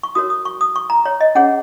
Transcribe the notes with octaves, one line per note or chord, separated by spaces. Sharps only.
C#6
F#4 A#4 C#5 D#6
D#6
C#6
D#6
C#6
A#5
C#5
D#5
C#4 G#4 C#5 F#5